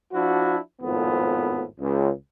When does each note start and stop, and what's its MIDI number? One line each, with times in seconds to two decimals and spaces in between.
0.13 0.57 53
0.13 0.57 62
0.13 0.57 64
0.13 0.57 66
0.82 1.64 32
0.82 1.64 41
0.82 1.64 45
0.82 1.64 53
0.82 1.64 59
1.80 2.10 37